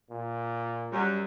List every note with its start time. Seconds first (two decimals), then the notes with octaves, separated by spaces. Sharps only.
0.10 A#2
0.92 F#2 G3